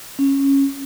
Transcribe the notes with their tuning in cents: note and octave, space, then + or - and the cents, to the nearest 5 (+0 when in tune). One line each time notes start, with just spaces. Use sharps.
C#4 -10